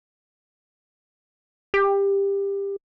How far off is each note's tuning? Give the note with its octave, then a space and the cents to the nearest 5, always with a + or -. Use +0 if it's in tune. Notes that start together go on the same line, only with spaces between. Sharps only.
G4 +20